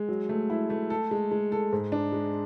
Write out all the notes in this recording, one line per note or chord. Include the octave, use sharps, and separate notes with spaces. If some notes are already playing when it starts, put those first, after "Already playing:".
Already playing: G#3
F#3
A3
E4
A3
A4
G#3
G#3
A4
G#2
D4
G#3